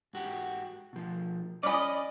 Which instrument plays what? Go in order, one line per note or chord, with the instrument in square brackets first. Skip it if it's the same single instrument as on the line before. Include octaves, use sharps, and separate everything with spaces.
[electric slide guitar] G#2 F#4 G4
B2 F3
[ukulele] C#4 B5 [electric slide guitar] D5 [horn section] D#5 [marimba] G#5 D6